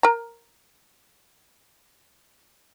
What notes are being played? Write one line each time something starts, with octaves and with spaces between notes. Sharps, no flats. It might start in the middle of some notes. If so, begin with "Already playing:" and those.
A#4 A#5